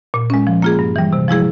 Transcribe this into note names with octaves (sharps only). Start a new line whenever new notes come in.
A#2
G#3 C#4
F3
A#3 F4 G#4
G2
E3 G3
C3
F3 G#3 E4 G#4